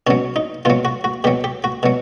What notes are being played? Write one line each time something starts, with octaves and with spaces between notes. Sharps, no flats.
B2 F#3 C#4
D#4
B2 F#3 F4
F#4
F#4
B2 F#3 G4
G4
F#4
B2 F#3